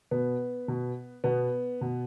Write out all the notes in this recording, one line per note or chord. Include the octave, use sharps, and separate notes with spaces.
B2 B3
B2
B2 B3
B2